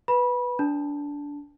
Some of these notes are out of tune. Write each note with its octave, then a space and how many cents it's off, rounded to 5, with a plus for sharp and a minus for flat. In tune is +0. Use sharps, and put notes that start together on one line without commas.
B4 +0 B5 -20
D4 -20 A5 +0